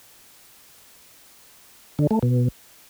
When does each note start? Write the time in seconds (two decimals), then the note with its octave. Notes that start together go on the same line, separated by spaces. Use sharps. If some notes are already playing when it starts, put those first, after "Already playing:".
1.99 D3
2.11 A3
2.23 B2